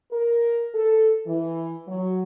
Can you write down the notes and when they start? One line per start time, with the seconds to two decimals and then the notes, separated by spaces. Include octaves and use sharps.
0.11 A#4
0.74 A4
1.26 E3
1.87 F#3